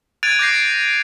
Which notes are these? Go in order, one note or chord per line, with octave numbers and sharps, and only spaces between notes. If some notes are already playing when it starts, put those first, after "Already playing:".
F#6 G#6 A6 D7 D#7 F7
D6 G6 A#6 C7